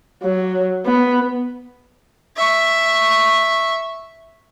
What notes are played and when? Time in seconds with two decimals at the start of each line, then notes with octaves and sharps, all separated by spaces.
0.23 F#3
0.86 B3
2.36 E5 C#6